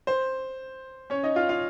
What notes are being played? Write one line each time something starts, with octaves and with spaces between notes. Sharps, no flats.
C5
C#4 C#5
D#4 D#5
F4 F5
F4 F5